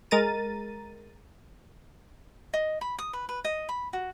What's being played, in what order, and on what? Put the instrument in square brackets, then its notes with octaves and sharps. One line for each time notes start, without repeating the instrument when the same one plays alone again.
[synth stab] G#3 A#4 A#5 A6 D#7
[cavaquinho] D#5
B5
D#6
B4
B4
D#5
B5
F#4